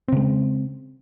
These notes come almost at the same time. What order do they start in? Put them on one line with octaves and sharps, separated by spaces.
C4 C#3 G#3